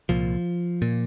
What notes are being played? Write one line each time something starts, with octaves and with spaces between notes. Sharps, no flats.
C2 A#2 F3
A#2